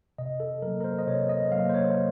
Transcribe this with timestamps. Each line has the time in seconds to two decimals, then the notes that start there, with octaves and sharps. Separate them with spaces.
0.18 C3 D#5
0.40 A4
0.62 F#3 A#3 A#4
0.80 A#4
0.84 C5
0.98 D#5
1.07 C3 C#5
1.29 D#5
1.52 F#3 A#3 F5
1.69 C5
1.74 C#5